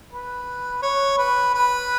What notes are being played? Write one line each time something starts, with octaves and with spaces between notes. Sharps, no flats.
B4
C#5
B4
B4